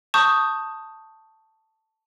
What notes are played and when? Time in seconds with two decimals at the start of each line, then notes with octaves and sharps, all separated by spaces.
0.14 A5 C#6 D#6 G6